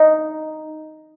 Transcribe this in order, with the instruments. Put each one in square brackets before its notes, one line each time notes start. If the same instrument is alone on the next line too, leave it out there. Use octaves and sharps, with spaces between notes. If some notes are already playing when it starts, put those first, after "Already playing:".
Already playing: [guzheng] D#4